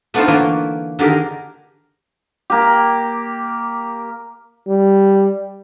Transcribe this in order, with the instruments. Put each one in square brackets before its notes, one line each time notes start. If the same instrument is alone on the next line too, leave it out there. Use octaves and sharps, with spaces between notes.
[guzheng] A3 B3 D4 D#4 F4 C5
D3 E3 A#3 B4 C#5 G5
D3 D#3 G4 G#4 A#4
[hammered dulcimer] A#3 G4
[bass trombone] G3